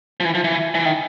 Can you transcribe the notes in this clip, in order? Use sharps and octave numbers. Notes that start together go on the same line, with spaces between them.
F3
E3
F3
E3
E3
D#3